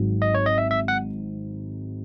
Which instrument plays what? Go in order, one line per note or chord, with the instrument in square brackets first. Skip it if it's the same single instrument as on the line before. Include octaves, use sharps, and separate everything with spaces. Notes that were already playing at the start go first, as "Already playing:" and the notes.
Already playing: [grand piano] G#1 G#2 F#3
[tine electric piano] D#5
C#5
D#5
E5
E5
F#5